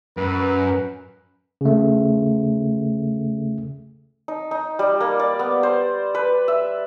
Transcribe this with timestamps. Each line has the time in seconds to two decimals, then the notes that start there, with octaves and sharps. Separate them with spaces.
0.17 F#2 B4
1.61 C#3 A3
4.28 D#4
4.51 D#4
4.79 G3
5.01 A#3
5.20 D5
5.39 B3
5.63 C5
6.15 B4
6.48 E5